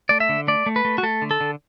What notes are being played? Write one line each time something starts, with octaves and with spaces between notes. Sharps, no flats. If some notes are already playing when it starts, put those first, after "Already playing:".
A3 D5
E5
D3
A3 D5
A3
B4
A3
F#4
A3 A4
D3
A4
D3